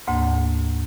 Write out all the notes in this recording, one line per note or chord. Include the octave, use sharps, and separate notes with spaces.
D2 G#2 A#3